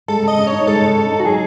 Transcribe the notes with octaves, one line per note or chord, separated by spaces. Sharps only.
G#3 A4
C#3
D#5
C#3
C#5
D#4
G#3 A4
C#3
C#3
D#4
F#4
F#3 G#4